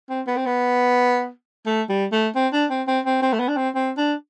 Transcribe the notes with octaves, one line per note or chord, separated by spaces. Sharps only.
C4
B3
C4
B3
A3
G3
A3
C4
D4
C4
C4
C4
C4
A3
B3
D4
C4
C4
D4